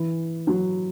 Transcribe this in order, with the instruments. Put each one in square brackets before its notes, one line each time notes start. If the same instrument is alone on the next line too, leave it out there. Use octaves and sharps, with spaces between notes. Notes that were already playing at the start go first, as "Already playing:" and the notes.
Already playing: [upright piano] E3
F#3